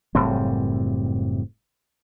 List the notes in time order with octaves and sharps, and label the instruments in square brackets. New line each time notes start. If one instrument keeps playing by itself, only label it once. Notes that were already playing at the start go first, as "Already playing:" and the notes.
[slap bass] F#1 A2 G3 C4